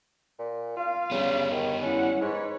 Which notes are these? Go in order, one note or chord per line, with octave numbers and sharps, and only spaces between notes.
A#2
F4 F5
C#3 G3 B3
D#3 C#5
C#4 E4 F#5
G#2 B4 C#5